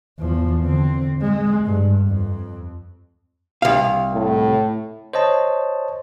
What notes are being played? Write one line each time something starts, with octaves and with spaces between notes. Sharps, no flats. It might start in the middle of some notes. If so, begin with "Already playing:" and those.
E2 F3
D3 C4
G#3
G2
F2
C2 F5
A2
C5 C#5 D#5 A5